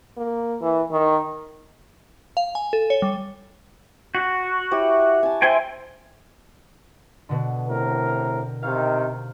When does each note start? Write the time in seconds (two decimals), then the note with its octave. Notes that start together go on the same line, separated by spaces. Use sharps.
0.17 A#3
0.61 E3
0.91 D#3
2.37 F5
2.55 G#5
2.73 A4
2.90 C#5
3.02 G3
4.15 F#4
4.71 E4 G4 C#5
5.23 G#5 A5
5.42 C5 E5 G5 G#5 C6
7.29 B2 D3
7.67 A2 C3 A#4
8.63 C3 D#3 F5